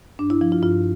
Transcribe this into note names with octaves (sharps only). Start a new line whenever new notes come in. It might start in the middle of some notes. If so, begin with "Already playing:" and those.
G2 D4
E4
F3 E4
F4
G2 F4